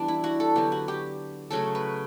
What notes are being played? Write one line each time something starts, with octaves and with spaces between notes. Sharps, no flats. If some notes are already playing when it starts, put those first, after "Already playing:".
Already playing: E3 G3 B3 D4
E4
F#4
A4
D3 F#3 B3 G4
F#4
G4
C#3 F#3 A3 A4
B4